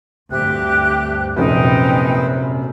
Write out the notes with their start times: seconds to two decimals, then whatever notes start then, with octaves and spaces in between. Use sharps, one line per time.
0.31 D2 G2 C4 G4 E5 F#6
1.36 F1 F#2 A#2 D#4 B4 C5 G5